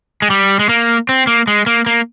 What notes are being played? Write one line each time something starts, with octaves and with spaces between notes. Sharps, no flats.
G#3
G3
G#3
A#3
C4
A#3
G#3
A#3
A#3